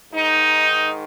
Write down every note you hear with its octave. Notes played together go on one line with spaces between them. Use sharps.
G#2 D#3 D#4